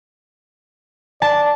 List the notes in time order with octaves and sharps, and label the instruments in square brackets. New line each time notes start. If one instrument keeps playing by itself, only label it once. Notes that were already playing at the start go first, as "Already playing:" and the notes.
[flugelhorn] D5 [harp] A5